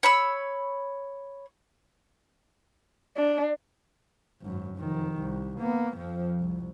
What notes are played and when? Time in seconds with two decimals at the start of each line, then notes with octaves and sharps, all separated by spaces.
0.03 C#5 B5 E6
3.17 D4
4.42 G#1 F#2
4.77 F1 D#3
5.19 C2
5.60 A#3 B3
5.97 F2 F3
6.40 C2